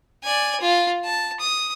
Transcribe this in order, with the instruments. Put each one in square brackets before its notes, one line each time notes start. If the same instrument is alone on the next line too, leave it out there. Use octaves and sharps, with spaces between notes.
[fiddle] D5 G#5
F4
A5
D#6